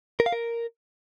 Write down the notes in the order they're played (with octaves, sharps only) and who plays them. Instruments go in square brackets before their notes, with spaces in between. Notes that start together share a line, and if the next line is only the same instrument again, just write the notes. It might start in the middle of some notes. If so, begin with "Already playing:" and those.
[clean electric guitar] A#4
F5
A#4